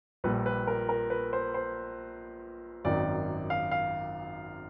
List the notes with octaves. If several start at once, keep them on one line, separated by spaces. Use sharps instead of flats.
A#1 A#2 G3 B4
B4
A#4
A#4
B4
C5
C5
G#1 F#2 D#3 D5
F5
F5